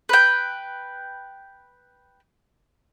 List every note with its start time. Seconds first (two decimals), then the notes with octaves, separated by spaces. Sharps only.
0.09 B4 G5